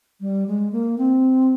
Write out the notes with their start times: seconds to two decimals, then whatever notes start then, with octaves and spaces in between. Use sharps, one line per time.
0.21 G3
0.47 G#3
0.72 A#3
0.98 C4